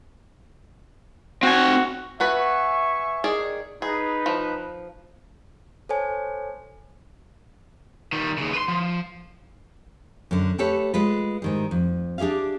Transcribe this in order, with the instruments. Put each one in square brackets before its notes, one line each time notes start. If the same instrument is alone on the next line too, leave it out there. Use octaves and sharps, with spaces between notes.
[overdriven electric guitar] C4 G#5 [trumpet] F#4
[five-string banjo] B3 F#4 B4 [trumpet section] E5 G#5 C#6
[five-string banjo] D#3 G#4 D5
[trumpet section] D#4 B4 [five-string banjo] G#4
[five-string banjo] F3
[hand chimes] A4 C5 C#5 G#5
[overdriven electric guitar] D#3 G3
D#2 C#3
B4 C6
F3
[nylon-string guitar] F#2 D3
A3 G4 A4 B4 C#5
G#3 F4 B4
G#2 D#3 G3
F2
D4 G4 G#4 E5 F5